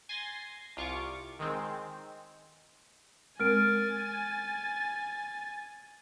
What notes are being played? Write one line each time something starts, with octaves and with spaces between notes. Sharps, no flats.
G#5 C6 A6 A#6
C2 F4 C#6 D6
D#3 G#3 C4
G#3 C4 A#4 G#5 F6 A6 D7